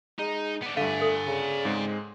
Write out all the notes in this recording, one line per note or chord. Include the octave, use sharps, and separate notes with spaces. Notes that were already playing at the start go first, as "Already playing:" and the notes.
G#3 D#4
B3 D4
G2 D3 A3 D5 F5 G#5
A4
C#3
G#2 G#3 C4